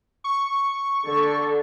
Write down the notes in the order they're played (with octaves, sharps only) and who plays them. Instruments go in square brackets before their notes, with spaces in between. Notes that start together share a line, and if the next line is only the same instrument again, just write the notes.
[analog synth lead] C#6
[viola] D3 A4